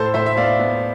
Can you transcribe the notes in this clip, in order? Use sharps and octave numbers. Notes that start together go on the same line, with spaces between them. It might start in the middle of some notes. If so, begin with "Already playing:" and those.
Already playing: A2 A4 C5
A2 C5 E5
E5
B3 D5 F5
B3